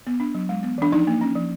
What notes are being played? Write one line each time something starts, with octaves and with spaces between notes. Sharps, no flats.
B3
D4
F#3
G#3
B3
E3 D4
F3 D#4
A#3
C#4
F3